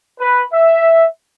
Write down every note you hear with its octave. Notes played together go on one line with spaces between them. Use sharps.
B4
E5